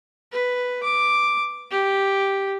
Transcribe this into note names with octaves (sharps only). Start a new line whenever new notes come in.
B4
D6
G4